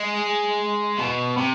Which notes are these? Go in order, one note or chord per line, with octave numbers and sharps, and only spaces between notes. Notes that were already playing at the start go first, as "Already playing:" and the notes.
Already playing: G#3
B2
C3